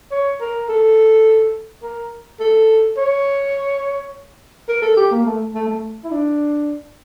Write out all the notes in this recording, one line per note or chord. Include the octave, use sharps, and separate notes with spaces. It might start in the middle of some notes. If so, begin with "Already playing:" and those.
C#5
A#4
A4
A#4
A4
C#5
A#4
A4
G4
A#3
A3
A3
A3
E4
D4